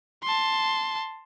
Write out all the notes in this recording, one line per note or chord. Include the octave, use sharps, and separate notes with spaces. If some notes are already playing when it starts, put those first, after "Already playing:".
A5 C6